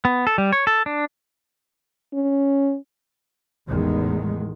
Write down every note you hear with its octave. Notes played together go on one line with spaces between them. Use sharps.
B3
A4
G3
C#5
A4
D4
C#4
A1 E2 D#3 G#3